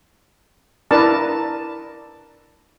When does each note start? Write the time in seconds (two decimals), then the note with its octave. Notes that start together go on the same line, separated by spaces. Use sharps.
0.91 D4 E4 A#4 B4 A5